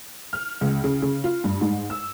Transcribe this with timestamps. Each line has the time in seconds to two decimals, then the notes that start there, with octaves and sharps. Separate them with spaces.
0.33 F6
0.61 C#2
0.84 C#3
1.02 C#3
1.24 F4
1.44 G2
1.61 G#2
1.90 E6